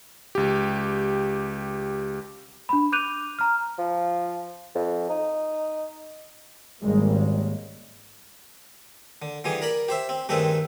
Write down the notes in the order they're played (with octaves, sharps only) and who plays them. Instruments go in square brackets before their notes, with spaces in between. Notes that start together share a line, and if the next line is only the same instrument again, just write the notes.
[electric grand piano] C#2 G4
[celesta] D4 B5
D6 F#6 G6 D#7 F7
A#5 F6
[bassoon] F3
F2
D#4
[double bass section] G#1 C#3 G3 G#3 A#3
[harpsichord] D3
D3 E3 G3 G#4
A#4 D5 B5
G4 C5 E5
C4
G2 D#3 G#3 A3 C4 E5